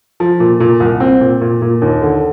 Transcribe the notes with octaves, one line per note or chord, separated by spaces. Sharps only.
F3
A#2
A#2
C2
C4
A#2
A#2
A#2
D#2
D3